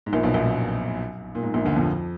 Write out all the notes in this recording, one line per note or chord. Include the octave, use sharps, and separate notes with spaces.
G#2
A#1 A#2
B1 B2
A#1 A#2
F#2
A#2
G#2
A#1 A#2
D2 D3
F2 F3